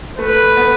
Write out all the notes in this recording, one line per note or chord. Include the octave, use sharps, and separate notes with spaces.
A3 B4
B3